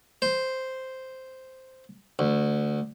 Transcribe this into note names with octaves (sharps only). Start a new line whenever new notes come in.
C5
D2